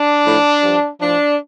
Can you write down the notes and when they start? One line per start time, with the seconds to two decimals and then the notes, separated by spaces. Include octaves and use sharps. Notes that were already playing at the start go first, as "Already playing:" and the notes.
Already playing: D4
0.24 A2 F3
0.62 G2 F3
1.00 A2 F3 D4